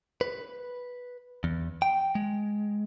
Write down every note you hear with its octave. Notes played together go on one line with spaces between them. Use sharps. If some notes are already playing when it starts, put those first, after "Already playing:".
B4
E2
G5
G#3